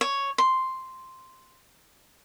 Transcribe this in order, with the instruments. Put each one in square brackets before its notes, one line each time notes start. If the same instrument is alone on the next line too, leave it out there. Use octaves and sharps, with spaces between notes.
[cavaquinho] C#5
C6